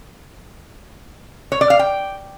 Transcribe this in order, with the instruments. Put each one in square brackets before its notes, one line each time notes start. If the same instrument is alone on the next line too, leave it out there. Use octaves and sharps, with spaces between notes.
[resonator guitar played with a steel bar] C#5
D5
F5
G5